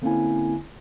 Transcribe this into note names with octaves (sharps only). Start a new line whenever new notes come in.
D3 A#3 C4 C#4 E4 G#5